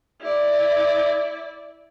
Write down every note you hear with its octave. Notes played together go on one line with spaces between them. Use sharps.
E4 D5